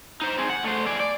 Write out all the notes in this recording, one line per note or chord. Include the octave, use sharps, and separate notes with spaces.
D#4 C5
C4 G#4
F#5
A3 C5
G#4 D5
D5